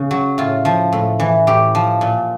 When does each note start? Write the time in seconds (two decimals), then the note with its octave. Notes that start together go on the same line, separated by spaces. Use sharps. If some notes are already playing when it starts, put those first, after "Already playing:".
Already playing: C#3
0.11 F#3
0.38 A2 F4
0.65 F3
0.93 A2
1.20 E3
1.47 A2 G4
1.75 F3
2.01 A#2